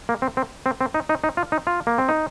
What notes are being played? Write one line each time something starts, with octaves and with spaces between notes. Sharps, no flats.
A#3
C4
C4
C4
C4
D#4
D#4
D#4
F4
D#4
F4
A#3
C4
D#4